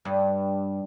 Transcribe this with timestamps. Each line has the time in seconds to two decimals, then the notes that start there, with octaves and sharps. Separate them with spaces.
0.05 G2